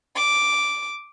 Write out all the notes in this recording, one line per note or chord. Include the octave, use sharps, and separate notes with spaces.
D6